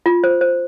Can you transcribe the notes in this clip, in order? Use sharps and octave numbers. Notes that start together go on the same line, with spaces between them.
F4
C5
C5